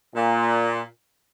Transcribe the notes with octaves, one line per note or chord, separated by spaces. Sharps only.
A#2